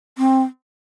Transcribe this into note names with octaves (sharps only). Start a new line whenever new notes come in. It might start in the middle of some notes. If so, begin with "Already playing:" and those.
C4